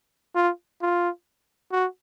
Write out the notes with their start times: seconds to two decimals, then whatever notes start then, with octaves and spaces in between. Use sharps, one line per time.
0.35 F4
0.82 F4
1.72 F#4